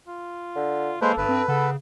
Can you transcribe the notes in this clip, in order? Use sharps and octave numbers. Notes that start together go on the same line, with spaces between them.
F4
D3
G#3 A#3 A4 B4 C5
G1 G2 B4
C4
C#3 B3 A4